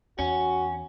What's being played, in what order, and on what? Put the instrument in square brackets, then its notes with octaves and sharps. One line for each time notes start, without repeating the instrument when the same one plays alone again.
[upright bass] E2 [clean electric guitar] C#4 [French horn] F#4